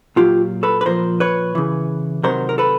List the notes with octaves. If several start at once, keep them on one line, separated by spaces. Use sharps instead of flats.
A#2 F#3 F4 G4
A4 B4
B4
A#2 F3 A#4 C5
B4 C#5
C#3 E3
C3 D#3 F#3 A#4 C5
A#4
A4 B4